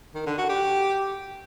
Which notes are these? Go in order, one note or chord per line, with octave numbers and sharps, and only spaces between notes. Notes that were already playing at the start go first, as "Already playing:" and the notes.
D#3
D3
F#4
G4